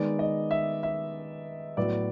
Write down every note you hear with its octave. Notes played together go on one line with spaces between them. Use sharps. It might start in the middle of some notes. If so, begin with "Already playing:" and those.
Already playing: D#3 G#3 B3 D5
D#5
E5
E5
A2 F#3 B3 D5